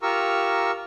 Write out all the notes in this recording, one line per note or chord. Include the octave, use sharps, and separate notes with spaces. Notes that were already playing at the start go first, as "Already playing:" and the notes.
F4 G4 A#4 A#5 C#6 E6